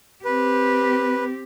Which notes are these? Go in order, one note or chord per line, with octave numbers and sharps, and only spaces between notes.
C4 G4 B4